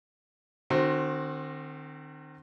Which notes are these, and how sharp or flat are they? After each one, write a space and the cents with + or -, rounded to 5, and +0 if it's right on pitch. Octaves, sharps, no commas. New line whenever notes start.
D#3 -40 C4 +15 F#4 +0